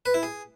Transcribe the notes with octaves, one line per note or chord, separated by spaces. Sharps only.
B4
E4
G#4